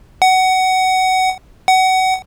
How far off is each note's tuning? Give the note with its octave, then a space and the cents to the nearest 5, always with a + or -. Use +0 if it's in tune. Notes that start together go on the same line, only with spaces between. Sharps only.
F#5 +20
F#5 +25